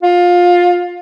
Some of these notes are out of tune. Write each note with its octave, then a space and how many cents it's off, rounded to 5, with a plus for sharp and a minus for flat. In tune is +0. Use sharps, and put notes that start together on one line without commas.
F4 +20